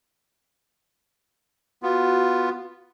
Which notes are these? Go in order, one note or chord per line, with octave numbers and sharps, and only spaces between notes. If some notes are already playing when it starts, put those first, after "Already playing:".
B3 F4 F#4